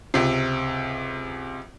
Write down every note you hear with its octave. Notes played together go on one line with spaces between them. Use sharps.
C#2 C3